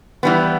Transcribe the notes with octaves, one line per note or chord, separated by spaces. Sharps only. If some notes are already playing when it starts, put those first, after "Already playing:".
E3 G3 B3